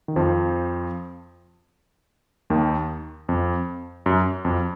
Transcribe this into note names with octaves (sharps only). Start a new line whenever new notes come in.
D#3
F2 F3
D#2 D#3
F2
F#2
F2